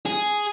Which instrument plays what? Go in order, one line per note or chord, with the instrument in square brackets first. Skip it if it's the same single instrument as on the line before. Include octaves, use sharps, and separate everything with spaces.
[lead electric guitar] G#4